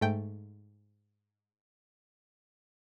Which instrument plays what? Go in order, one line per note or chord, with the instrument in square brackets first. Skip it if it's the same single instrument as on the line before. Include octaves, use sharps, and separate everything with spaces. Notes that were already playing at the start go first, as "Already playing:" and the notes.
[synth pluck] G#2 A3 G5